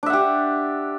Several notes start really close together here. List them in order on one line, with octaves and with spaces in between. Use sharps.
D4 E5 F#5 G4